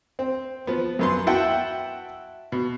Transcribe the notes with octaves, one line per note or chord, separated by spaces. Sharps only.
C4
F3 B3
F#2 B3 C6
E4 F#4 E5 F#5 G5 A5
B2